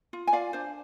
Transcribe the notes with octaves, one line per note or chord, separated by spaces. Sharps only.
F4
G#5
F4 D5 F5
D4 C5